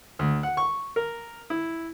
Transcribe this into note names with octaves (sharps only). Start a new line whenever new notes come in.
D2
F#5
C#6
A#4
E4